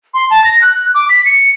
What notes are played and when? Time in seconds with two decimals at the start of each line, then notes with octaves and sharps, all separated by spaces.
0.14 C6
0.30 A5
0.44 A#6
0.62 F#6
0.94 D6
1.09 B6
1.25 C#7